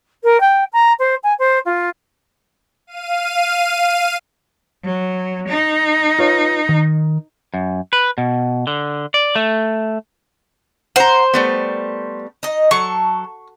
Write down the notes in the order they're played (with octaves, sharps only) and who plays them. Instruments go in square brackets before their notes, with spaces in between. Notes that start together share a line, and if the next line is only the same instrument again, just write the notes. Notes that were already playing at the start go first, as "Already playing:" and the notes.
[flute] A#4
G5
A#5
C5
G#5
C5
F4
[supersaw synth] F5 D#7
[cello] F#3
D#4
[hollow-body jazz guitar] F4 B4 C#5
D#3
[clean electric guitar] F#2
B4
B2
D3
D5
A3
[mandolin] C5 [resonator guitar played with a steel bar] F#5 A#5
[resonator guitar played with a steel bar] G3 A3 B3
[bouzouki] D#4 D#5
[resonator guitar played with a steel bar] F#3 [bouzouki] A4 [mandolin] C#6